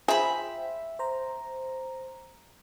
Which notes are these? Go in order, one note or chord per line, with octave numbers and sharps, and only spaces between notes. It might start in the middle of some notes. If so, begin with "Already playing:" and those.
F4 G#4 C5 E5 G5 B5
C5 A#5